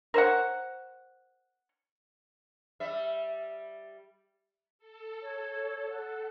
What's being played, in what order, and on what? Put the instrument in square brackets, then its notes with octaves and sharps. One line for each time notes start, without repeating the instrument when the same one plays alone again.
[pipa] A#4 C5 C#5 F#5
[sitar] G3 E5
[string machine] A4
[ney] C#5
F#5